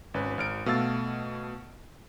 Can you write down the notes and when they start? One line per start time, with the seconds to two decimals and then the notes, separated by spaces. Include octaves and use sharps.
0.14 G#1 C#4 B4
0.38 G#1 F6 D7
0.66 B2 A3 F5 E6 A6